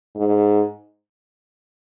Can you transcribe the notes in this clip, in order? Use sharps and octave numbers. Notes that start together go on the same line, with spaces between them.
G#2